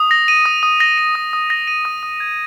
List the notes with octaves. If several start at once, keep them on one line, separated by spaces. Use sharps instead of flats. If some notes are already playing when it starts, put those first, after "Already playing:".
Already playing: D#6
A#6
D#7
D#6
D#6
A#6
D#7
D#6
D#6
A#6
D#7
D#6
D#6
G#6